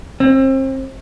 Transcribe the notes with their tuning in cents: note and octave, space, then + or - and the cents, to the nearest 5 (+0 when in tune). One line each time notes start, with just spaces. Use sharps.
C4 +35